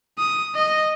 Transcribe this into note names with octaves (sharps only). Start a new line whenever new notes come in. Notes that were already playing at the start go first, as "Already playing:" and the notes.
D#6
D#5